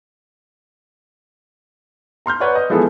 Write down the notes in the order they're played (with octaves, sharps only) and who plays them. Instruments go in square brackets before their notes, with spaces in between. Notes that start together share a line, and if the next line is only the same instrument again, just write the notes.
[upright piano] A#5 C6 F6 G6
B4 C#5 D5 F#5 C#6
D#5
E3 F3 G#3 B3 G#4 A4